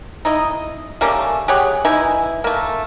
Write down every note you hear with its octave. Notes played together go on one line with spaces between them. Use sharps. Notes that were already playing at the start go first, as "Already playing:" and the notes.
D#4 E4 D#5
G3 A3 A#3 C#4
G4 G#4 C#5 F#5
E3 D#4 E4 G#5
A3 A#3